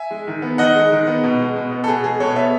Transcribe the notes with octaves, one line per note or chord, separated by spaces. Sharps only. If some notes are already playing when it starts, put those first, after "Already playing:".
Already playing: E5 G#5
G#3
D#3
B3
D#3 D#5 F#5
G#3
D#3
B3
B2
G#3
B2
B3
A4
B2 G#4
G#3 G#4
B2 A4 C#5
B3 C#5 E5